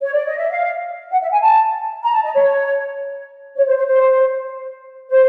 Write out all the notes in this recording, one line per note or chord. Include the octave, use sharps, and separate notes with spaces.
C#5
D5
D#5
E5
F5
F#5
E5
G#5
A5
A#5
A5
D#5
C#5
C#5
C5
C5
C5
C5